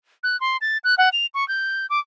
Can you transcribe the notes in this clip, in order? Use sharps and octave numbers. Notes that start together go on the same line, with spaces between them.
F#6
C6
A6
F#6
F#5
F7
C#6
G6
D6